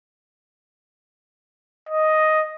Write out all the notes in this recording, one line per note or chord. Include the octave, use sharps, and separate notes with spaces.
D#5